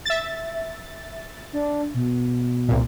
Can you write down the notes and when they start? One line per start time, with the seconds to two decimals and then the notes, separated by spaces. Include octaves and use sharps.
0.05 E5 A6
1.53 D4
1.94 B2
2.69 C2 A#2